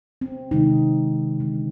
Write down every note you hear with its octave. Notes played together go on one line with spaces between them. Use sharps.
C4
C3 D#3 G#3 D#4
D3 G#3